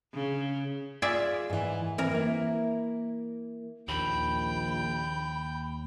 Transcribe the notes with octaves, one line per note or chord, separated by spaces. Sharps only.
C#3
F4 G#4 D5 E5
G#2 E3
E3 C4 A#4
A#3 E4
A#1 D#2 G5 B5